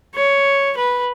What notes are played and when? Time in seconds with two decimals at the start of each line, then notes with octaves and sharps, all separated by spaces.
0.15 C#5
0.77 B4